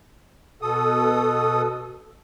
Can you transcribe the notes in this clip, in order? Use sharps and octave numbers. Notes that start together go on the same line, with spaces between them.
B2 A4 D#6